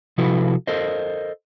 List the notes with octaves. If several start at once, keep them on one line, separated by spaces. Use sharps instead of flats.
C3 F3 E4 F#4 A4 B4
A4 A#4 C5 D#5